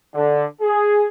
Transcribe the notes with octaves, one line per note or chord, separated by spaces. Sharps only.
D3
G#4